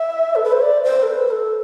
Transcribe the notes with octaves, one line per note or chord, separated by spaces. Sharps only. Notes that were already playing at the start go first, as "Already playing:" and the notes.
Already playing: E5
A4
B4
C5
D5
C5
A4
B4
B4
A4